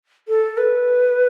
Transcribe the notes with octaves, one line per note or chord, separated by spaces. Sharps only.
A4
B4